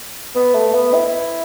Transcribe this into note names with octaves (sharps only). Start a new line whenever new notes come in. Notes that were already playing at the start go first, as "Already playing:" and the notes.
B3
A3
B3
E4